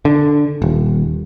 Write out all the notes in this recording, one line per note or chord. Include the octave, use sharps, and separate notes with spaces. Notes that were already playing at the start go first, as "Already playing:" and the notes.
D3
D#1